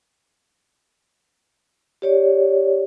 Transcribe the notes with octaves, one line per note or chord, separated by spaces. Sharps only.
G4 C#5 D5